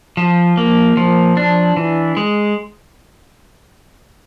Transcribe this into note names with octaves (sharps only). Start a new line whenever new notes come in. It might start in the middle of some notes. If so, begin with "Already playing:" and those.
F3
A#3
F3
D4
E3
G#3